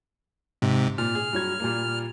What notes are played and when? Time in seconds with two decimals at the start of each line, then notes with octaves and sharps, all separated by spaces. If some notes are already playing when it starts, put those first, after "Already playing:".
0.62 G#2 C3
0.98 A#2 F6
1.15 G#4
1.33 G2 F#3 G#6
1.60 A#2 G3 A#3